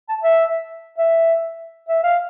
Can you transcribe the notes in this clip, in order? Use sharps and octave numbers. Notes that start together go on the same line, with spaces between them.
A5
E5
E5
E5
F5